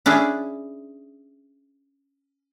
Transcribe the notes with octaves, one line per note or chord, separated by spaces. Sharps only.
C#4 D4 E4 G#4